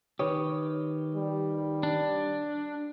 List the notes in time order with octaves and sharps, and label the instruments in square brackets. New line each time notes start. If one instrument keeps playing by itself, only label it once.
[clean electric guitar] D#3 G4 [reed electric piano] B4 C#5 D#6
[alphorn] G3
[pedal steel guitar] D4